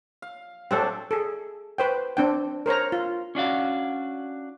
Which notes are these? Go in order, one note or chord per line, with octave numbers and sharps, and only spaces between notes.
F5
F#3 G#3 A3 C4 D4 A4
G#4 A4
B4 C5 G5
C4 D4 G5
A#4 C5 C#5 A#5
F4
C#4 D4 F#4 F5